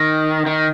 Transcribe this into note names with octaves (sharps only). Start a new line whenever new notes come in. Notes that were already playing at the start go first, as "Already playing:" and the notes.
Already playing: D#3
D#3